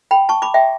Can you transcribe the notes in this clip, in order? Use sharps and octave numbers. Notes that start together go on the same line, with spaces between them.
G5 B5
A5 C#6
B5 D6
E5 G5